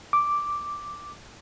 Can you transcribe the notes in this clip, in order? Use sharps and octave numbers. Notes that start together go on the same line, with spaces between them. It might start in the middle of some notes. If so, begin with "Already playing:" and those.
D6